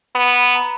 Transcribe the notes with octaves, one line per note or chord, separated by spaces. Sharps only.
B3 B5
B5
A#5